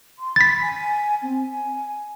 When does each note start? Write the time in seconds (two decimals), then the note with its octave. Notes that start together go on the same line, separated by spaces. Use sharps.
0.19 C6
0.36 B5 A6 B6
0.62 G#5
1.23 C4
1.49 G#5